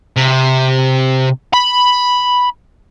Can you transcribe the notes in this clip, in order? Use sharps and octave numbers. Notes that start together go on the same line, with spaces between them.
C3
B5